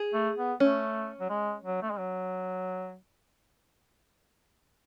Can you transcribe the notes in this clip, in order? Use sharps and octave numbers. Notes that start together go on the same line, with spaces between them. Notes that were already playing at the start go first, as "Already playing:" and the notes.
Already playing: G#4
A3
B3
A3 C#4
F#3
G#3
F#3
A3
G#3
F#3